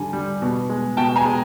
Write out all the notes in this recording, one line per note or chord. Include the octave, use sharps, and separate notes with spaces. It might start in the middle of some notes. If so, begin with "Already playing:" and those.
Already playing: D3 G3 G#5
G3
B2
G#3
B2 G5 A5
G#5 A#5
G#3